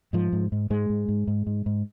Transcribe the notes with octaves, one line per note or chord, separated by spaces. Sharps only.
G#2 F3
G#2
G#2
G#2 G#3
G#2
G#2
G#2
G#2
G#2